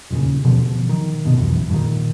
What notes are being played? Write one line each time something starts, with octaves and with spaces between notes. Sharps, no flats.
D#1 D#2 C#3
B2 D3 F3
D#3
G1 D2 B2
F1 B1 E2
G2 A#2 D#3